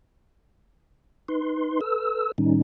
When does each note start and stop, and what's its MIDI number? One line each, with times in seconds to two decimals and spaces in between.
1.28 1.80 63
1.28 1.80 71
1.28 1.80 84
1.81 2.32 69
1.81 2.32 71
1.81 2.32 88
2.38 2.62 45
2.38 2.62 51
2.38 2.62 55
2.38 2.62 61
2.38 2.62 63